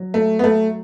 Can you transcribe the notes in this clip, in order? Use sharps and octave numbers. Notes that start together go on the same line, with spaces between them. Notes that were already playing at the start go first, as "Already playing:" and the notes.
Already playing: F#3
A3
B3
A3